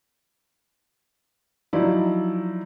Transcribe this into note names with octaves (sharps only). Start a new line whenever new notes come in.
F3 F#3 D#4 E4 D5